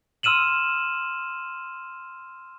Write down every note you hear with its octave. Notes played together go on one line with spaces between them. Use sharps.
C6 E6 F6 D#7 E7 F#7